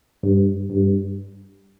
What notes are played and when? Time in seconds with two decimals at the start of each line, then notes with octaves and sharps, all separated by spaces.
0.23 G2
0.71 G2